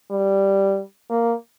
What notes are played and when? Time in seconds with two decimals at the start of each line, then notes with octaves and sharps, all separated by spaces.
0.11 G3
1.10 A#3